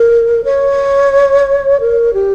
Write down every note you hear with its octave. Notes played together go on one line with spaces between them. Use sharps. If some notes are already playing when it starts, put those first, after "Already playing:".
Already playing: A#4
C#5
A#4
G4